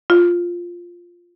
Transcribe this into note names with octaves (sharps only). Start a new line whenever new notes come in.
F4